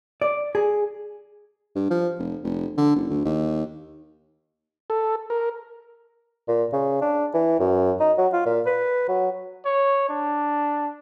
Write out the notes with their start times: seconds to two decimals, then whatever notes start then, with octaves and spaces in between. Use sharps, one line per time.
0.22 D5
0.55 G#4
1.75 G2
1.90 F3
2.19 F1
2.43 F1
2.77 D3
2.96 F#1
3.10 D2
3.25 D#2
4.90 A4
5.30 A#4
6.48 A#2
6.73 C#3
7.01 D4
7.34 E3
7.60 F#2
8.00 D#4
8.18 F#3
8.33 F4
8.46 A#2
8.66 B4
9.08 F#3
9.66 C#5
10.09 D4